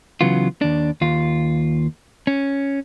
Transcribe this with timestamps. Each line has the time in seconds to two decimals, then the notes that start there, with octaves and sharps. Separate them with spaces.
0.21 C#3 E3 F#3 B3 F4
0.61 D#2 D4
1.01 D#2 F4
2.27 C#4